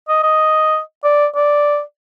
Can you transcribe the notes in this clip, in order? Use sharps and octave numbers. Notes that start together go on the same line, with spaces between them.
D#5
D#5
D5
D5